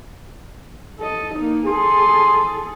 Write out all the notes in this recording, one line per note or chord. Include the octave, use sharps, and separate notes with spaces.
A4 D#5
A#3 D#4
G#4 A4 C6